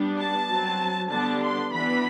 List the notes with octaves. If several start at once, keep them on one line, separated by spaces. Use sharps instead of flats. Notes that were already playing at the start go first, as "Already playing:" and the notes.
Already playing: G3 B3 D4
A5
F#3 C4
D3 G3 B3 D4 A5
C6
E3 B3 D4 B5